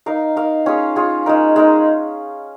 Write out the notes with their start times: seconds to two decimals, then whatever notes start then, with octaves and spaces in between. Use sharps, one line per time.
0.06 D#4 A#4 F5
0.36 D#4 A#4 F5
0.66 C#4 F4 G#4
0.96 C#4 F4 G#4
1.26 G#3 D#4 A#4
1.56 G#3 D#4 A#4